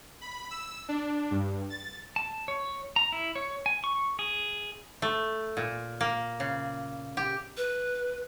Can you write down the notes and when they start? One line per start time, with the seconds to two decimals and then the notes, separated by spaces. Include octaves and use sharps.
0.21 B5
0.50 E6
0.89 D4
1.31 G2
1.70 A6
2.16 A5
2.48 C#5
2.96 A#5
3.12 E4
3.35 C#5
3.66 G#5
3.84 C#6
4.19 G#4
5.02 A3
5.57 A#2
6.01 A#3
6.40 C#3
7.17 G4
7.57 B4